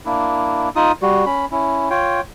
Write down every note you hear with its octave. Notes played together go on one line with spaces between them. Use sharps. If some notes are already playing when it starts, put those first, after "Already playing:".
A#3 D4 E4
D#4 F4 D#6
G3 F#4
C#4 B5
C#4 E4
F4 C#5 G5